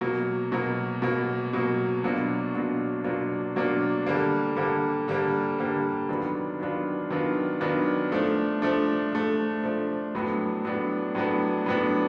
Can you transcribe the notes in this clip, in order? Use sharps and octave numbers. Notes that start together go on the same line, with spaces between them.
B2 F#3 A#3
B2 F#3 A#3
B2 F#3 A#3
B2 F#3 A#3
B2 F#3 A#3 D4 F4
B2 F#3 A#3 D4 F4
B2 F#3 A#3 D4 F4
B2 F#3 A#3 D4 F4
D3 G3 A#3
D3 G3 A#3
D3 G3 A#3
D3 G3 A#3
D#3 F#3 B3 D4 F4
D#3 F#3 B3 D4 F4
D#3 F#3 B3 D4 F4
D#3 F#3 B3 D4 F4
F3 A3 D4
F3 A3 D4
F3 A3 D4
F3 A3 D4
A2 F#3 B3 D4
A2 F#3 B3 D4
A2 F#3 B3 D4
A2 F#3 B3 D4